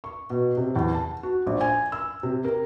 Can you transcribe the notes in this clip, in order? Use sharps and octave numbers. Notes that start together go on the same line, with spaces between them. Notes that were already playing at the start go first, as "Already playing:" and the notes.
C#6
B2
C3
E2
A5
F#4
A#1
G#5
E6
C3
A#4